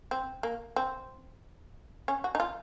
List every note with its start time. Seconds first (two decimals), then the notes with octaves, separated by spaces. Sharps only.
0.11 C4
0.43 A#3
0.76 C4
2.08 C#4
2.24 F#4
2.35 D#4
2.40 F4